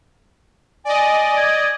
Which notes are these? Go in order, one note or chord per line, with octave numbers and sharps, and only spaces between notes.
D5 D#5 G#5
G#6